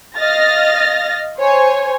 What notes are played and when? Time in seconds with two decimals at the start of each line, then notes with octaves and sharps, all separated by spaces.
0.17 D#5 F5 F6 A6 A#6
1.38 C5 C#5 G#5